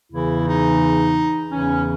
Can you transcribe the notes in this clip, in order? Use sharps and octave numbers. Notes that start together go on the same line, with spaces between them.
E2 C#3 E3 E4
D#4
E2 C#3 E3 C#4